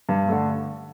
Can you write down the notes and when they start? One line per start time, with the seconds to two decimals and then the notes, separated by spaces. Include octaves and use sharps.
0.09 G2
0.28 D3 A3